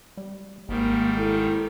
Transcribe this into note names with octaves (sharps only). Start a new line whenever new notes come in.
G3
G#1 G#2 D#3 G3 A#3
E4 A4